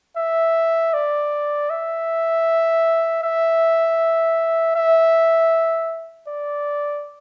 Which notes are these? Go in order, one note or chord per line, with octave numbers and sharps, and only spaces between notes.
E5
D5
E5
E5
E5
D5